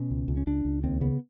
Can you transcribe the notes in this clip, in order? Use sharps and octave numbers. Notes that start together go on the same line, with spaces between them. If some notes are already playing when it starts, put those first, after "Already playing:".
Already playing: B2 C#4
C#2
C#2
C#4
C#2 D4
C#2
D#2 C4
C#3 B3